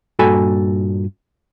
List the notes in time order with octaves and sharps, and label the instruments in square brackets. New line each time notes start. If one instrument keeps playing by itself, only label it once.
[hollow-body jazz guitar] G2 A#2 F#4 A4 G#5 B5